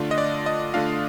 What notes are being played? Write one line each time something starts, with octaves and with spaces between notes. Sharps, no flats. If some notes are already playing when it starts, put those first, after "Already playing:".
Already playing: D3 A3 D4 F4
D#5
D5
D#5
D3 A3 D4 F4 F5